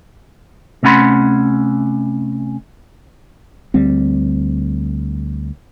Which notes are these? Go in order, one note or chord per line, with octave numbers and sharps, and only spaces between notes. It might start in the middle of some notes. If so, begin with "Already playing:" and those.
C3 A3 C#4 F#5 B5 C6
D2 G3 C4